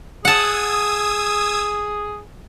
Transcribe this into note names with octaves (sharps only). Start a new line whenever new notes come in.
G#4 F#5 A5 D#6 E6 G#6